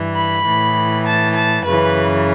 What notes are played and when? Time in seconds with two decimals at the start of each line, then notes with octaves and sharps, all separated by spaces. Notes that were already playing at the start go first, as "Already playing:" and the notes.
Already playing: G2 E3
0.16 B5
0.45 A2 E3
1.06 A5
1.35 A5
1.65 F#2 C#3 E3 B4